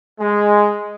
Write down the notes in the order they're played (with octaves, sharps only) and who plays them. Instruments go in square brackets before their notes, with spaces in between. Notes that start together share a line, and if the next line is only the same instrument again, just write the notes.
[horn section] G#3